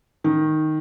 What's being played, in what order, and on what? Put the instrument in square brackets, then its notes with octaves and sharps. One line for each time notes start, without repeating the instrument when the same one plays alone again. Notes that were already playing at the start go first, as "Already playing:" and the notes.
[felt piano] D#3